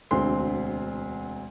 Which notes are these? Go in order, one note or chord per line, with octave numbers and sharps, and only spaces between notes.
E1 D2 C4 C6